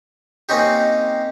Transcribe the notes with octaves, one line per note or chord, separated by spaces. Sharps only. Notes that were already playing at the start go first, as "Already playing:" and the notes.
A#3 C4 C#4 D#4 G4